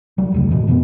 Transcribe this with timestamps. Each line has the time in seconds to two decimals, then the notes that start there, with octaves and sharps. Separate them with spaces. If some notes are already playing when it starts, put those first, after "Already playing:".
0.18 C2 F#3 G3
0.32 F1 D2 C#3
0.50 G#2 B2 E3
0.67 F2 B2 A#3 B3